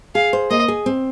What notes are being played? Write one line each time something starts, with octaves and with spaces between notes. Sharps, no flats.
G#4 F5
C5
A#3 D#5
G#4
C4